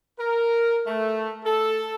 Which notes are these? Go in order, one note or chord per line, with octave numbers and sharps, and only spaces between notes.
A#4
A3
A4